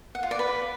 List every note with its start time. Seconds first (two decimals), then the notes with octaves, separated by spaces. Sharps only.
0.15 F#5
0.23 F4
0.31 D5
0.39 B4